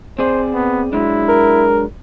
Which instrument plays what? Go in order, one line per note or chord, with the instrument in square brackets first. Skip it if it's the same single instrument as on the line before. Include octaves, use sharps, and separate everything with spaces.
[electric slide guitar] C4 G#4 D5 [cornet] C5
[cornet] B3
[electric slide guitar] F#3 G#3 D4 [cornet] E4
[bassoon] A#4